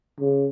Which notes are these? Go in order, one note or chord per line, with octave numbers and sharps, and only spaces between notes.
C#3